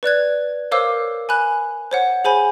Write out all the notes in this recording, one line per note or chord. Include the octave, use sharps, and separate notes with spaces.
B4 D5 F#6 G#6
A#4 C5 C#5 F5 D6 E6
G#5 B5 F#6
C5 C#5 F#5
G#4 C5 G#5 B5